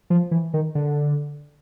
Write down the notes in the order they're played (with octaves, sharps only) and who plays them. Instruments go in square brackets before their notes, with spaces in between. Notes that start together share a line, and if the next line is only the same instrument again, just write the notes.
[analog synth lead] F3
E3
D#3
D3